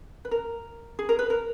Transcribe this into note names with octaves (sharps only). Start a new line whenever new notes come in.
B4
A#4
G#4
A#4
B4
A#4